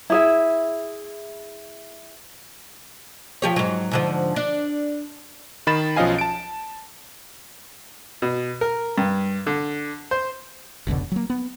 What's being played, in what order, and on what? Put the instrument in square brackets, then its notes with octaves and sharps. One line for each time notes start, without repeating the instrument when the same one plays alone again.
[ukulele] E4 G#4 E5
[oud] F3 G4 C#5
G#2 F#3
G#2 D3 F3
D4
[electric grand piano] D#3 B5 A6 E7
B1 F3 C#4 D#5 F5 G#5
A5 D7
[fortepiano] B2
A#4
G2
D3
C5
[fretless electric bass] F1 C#2 B2 D3
F#3 A#3
B3